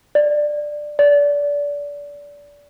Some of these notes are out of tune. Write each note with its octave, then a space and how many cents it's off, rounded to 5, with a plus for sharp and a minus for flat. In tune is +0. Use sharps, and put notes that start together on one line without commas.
D5 +10
D5 -25